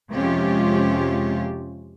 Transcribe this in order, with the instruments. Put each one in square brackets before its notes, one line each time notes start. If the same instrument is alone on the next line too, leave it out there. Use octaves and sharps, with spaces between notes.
[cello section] F2 C3 G#3 C#4 F4 G4